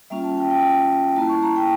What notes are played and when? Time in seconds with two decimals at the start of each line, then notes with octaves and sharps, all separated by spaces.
0.10 G3 A#3 C#4 F4 E5
0.24 A5
0.37 G5
0.50 G5
1.16 A#3 E4 A5
1.29 C#6
1.43 A#5
1.56 G5